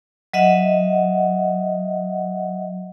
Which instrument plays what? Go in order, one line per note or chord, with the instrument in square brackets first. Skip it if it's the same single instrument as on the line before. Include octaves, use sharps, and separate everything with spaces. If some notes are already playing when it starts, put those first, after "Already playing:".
[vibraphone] F#3 D#5 E5 F#5